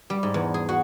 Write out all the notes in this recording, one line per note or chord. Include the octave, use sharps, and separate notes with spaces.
G3
G#2
E2
G#4
F#4